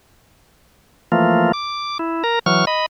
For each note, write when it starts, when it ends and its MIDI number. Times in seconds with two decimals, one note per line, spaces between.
1.12 1.52 52
1.12 1.52 53
1.12 1.52 57
1.12 1.52 58
1.12 1.52 65
1.53 1.98 86
1.99 2.23 64
2.24 2.39 70
2.24 2.39 82
2.46 2.65 52
2.46 2.65 54
2.46 2.65 85
2.46 2.65 89
2.67 2.86 75
2.67 2.86 83